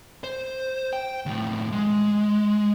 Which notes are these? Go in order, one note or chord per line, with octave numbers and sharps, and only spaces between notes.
C5
G5
D#2 A2
G#3